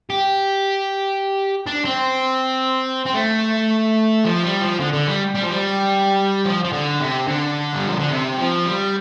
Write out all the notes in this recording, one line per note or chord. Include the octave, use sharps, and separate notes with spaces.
G4
D4
C4
C4
A3
F3
G3
F3
D3
D3
G3
G3
F3
G3
F3
F3
D3
C3
D3
G3
F3
D3
C3
F3
G3